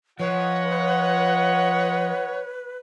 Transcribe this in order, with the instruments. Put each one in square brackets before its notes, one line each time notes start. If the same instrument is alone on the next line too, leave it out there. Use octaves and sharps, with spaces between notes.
[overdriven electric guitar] F3 [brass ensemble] F4 D#5 F#5 [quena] B4 [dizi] C#5